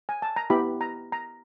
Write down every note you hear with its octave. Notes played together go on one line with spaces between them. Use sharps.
G#5
A5
A#5
B3 E4 G4 B5
A#5
A#5